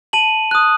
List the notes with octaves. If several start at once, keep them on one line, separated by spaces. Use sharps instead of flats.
A5 D#7 F#7
D#6 F#6